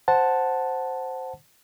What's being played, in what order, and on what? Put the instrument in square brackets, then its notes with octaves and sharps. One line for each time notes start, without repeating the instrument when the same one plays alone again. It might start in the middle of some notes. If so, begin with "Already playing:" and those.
[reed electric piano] C5 F#5 A5